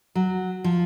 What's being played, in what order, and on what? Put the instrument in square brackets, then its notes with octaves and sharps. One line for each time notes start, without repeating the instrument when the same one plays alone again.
[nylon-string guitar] F#3
F3